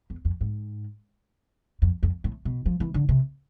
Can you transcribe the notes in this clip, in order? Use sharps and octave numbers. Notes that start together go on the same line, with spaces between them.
E2
F2
G#2
F2
F2
A2
B2
F3
E3
D3
C3